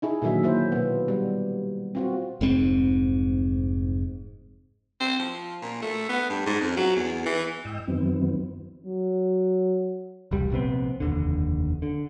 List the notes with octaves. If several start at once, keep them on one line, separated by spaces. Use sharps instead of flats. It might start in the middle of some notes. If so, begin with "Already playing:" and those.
D#4 E4 G#4
A#2 D3 D#3 F#3 E5
A#3 E4 C5
B2 B3
G3
C4 F4 F#4
F1 G#2 C4
C4
F3
A#2
A3
B3
G2
G#2
F2
F#3
E2
E3
G#2 D#5 G5 E6
F#2 D#3 E3 F#3 B3 C4
F#3
E1 C2 G3
A#1 C3 B3 C4
F1 D#2 D3
D3